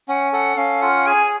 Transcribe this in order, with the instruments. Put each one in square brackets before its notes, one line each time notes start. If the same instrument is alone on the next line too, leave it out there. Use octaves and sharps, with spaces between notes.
[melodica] C#4 [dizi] F#5
[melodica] A4 [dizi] F#5
[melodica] C#4 [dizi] F5
[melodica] F4 [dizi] F#5
[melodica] G#4 [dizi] G#5